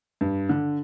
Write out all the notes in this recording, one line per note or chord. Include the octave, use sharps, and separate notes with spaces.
G2
D3